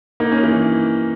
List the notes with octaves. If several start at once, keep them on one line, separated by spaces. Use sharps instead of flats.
A#3 D#4
C#4
E3